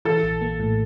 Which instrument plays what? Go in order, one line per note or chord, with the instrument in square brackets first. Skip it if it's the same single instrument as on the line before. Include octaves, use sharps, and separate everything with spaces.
[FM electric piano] E3 [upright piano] A4
[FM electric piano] A#1
A#3
A2